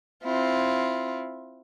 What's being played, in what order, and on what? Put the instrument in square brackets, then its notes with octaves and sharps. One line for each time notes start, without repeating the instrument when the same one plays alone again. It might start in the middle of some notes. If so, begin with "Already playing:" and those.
[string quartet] C4 E4 F4